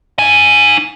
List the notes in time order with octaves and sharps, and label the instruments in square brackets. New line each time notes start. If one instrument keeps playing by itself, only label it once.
[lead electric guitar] D#4 G#5